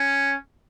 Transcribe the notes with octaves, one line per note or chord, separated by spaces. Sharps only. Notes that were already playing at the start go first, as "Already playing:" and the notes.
Already playing: C#4